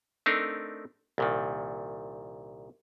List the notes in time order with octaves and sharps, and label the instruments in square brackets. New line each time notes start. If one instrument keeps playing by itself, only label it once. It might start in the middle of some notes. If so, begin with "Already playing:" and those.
[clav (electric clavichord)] A3 C4 D4 D#4 A#4
C2 A#2 D#3